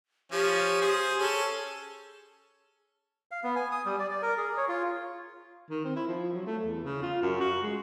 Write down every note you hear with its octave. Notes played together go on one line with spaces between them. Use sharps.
F3 C#4 G4
G#4 C5
C#4 G#4 A4
F5
B3
G#5
D#6
G3
D5
D5
A#4
G#4
C#5
F4
D#3
C4
E4
F3
F#3
A3
E2
C#3
F4
F#2
F#4
G#3